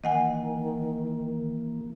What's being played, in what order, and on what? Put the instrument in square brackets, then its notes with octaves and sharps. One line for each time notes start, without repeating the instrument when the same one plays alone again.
[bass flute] D#3 [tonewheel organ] E3 A#3 [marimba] D#5 F#5 G#5